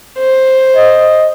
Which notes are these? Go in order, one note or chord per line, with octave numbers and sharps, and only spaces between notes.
C5
D#5